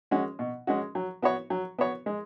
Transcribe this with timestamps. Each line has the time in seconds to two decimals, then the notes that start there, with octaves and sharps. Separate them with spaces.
0.11 G#3 C#4 F#4
0.39 B2
0.67 G#3 C#4 F#4
0.95 F#3
1.22 B3 F#4 C#5
1.50 F#3
1.79 B3 F#4 C#5
2.06 G#3